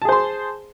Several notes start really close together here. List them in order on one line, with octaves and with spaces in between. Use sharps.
A5 G#4 C5 C6